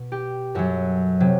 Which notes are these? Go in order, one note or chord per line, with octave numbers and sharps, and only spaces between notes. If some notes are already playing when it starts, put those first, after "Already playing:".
Already playing: B2
G4
F#2 F#3 F#4 A4
C3 F#3